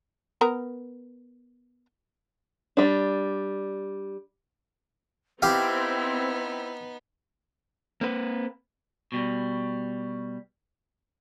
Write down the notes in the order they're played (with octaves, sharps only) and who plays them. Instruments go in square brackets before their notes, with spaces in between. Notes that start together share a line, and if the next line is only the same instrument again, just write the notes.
[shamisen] B3 A#4 A#5
[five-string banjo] G3 D4
[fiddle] B3 D#4 [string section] C4 [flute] E4 [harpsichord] G4 F5
[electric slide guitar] A#3 C4 B4
[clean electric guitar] B2 G3